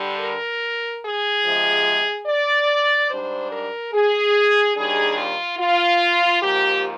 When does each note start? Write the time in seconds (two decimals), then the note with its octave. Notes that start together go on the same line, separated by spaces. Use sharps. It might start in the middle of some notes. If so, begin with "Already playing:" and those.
Already playing: G2 D3 G3
0.20 A#4
1.03 G#4
1.45 C3 F3 G#3
2.27 D5
3.09 G#2 G3 D4 C5
3.52 A#4
3.93 G#4
4.76 D#2 D#3 G3 D4 G#4
5.17 F4
5.58 F4
6.42 G#2 F3 A#3 G4